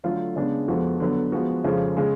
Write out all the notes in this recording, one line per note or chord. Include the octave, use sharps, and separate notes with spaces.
D3 F#3 A3 F4
C#3 G#3 B3 D4
F2 F3 G#3 B3 F#4
D3 F#3 B3
F3 G#3 B3 F#4
F2 C#3 F3 G#3
C#3 G#3